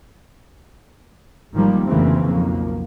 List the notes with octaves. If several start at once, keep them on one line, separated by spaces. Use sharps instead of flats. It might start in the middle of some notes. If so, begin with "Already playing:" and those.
G#1 D#3 F3 G3 A#3
F1 D2 C#3 E3 A#3 C4
B1 F2 F3 A#3